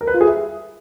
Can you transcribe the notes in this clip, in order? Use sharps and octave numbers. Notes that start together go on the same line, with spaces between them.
A#4
B4
F4
G#4
E5